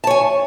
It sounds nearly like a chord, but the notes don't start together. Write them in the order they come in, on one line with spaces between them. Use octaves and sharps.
A5 C#5 G#5